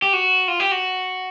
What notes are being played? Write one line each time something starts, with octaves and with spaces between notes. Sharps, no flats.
G4
F#4
F4
G4
F#4